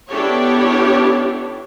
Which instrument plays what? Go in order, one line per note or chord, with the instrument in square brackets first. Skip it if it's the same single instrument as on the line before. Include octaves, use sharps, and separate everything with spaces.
[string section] B3 D4 E4 G4 A4 C#5